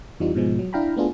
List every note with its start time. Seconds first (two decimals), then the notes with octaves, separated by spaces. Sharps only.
0.20 F2 E3 F3 G3 D#4 F4
0.35 G#2 B2 F3 G#3
0.59 F#3
0.73 D4 E4 F5 G5 A#5 B5
0.97 A3 B3 D4 F4 G#4